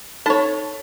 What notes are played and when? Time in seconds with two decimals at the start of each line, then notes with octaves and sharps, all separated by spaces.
0.26 D#4 A4 C#5 A5